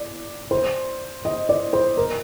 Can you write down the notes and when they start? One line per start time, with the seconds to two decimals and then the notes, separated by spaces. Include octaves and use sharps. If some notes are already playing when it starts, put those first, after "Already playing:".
Already playing: D5
0.51 C5
1.25 D#5
1.49 D5
1.73 C5
1.97 A#4